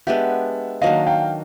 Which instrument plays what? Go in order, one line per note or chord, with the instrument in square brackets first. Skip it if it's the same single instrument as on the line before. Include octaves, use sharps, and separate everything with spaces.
[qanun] G#3 B3 D4 G4 [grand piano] E5 F#5
[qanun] D#3 F#3 A#3 D4 [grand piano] D#5 F5
[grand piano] F5 G5